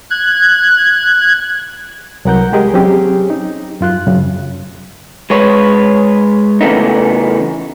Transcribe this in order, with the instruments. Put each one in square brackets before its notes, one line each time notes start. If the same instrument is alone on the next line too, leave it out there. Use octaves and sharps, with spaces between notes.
[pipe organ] F#6 G#6
[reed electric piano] C2 F#3 A#4 F#5 A#5 G6
G#3 G4 G#4 A#4 D#5
F#3 C4 C#4 G4 G#4
D#4
F#2 F4 F#6
F#2 C#3
[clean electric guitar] G#3 B4 C#5
C#3 E3 G#3 A3 B3 D#4